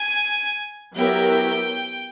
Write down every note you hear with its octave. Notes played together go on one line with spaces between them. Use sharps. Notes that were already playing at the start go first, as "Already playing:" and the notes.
Already playing: G#5
F#3 B3 E4 G4 A#4 G5